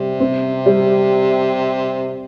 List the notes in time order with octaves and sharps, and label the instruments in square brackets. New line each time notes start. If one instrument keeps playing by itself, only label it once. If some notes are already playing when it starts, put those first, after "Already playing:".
Already playing: [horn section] C3 [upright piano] G3
[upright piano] C4
G3